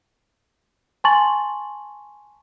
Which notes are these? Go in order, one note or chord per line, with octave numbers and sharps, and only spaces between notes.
G#5 A5 C6 C#6 A6 F#7